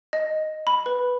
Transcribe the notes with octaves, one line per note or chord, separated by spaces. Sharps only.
D#5
B5
B4